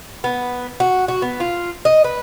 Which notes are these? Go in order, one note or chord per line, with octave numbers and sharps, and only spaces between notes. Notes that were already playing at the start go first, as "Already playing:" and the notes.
B3
F#4
F#4
B3
F4
D#5
B4